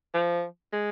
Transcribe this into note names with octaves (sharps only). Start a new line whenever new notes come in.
F3
G#3